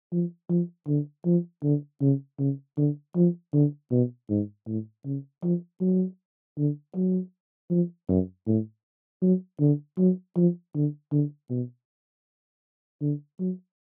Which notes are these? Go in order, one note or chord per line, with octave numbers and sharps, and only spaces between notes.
F3
F3
D3
F3
D3
C#3
C#3
D3
F3
D3
B2
G#2
A2
C#3
F3
F#3
D3
F#3
F3
F#2
A2
F#3
D3
F#3
F3
D3
D3
B2
D3
F#3